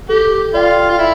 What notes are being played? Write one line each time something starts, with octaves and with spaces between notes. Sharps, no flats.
G4 A4
F4 D5 G5
F4
E4